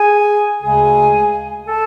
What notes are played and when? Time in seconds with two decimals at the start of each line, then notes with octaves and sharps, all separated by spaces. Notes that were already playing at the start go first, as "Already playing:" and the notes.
Already playing: G#4 G#5
0.62 D2 C#3 G#3 G#4 G#5
1.67 A4 A5